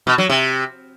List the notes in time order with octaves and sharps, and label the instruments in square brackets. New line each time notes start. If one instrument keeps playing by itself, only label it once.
[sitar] B2
F#3
C3